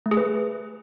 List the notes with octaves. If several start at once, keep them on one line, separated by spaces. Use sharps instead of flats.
A3
G#4
B4